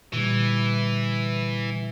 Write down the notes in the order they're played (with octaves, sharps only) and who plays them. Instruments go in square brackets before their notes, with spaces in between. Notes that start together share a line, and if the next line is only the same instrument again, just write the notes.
[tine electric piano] A#2 D3 G3 [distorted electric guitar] E3